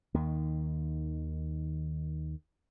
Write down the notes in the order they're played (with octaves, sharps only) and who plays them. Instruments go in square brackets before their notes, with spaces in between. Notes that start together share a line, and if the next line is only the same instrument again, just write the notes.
[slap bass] D#2 D#3